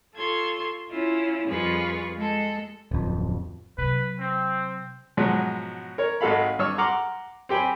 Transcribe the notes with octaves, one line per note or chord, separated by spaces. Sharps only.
F4 A4 C#5 C6 G#6
C#4 E4 F4
F2 G3 F4 G#4 B4 C#6
G#3 A4
D1 F2
C3 F#3 B4
C4
G#2 B2 F3 F#3 G#3
A#4 C#5
G#1 G#3 F#4 A4 F5 B5
G2 C#5 C#6 E6 F6
F#5 A#5 C6 D6 F6
C4 G4 G5 G#5 B5